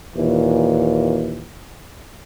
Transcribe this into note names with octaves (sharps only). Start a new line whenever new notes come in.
D#2 A#2 E3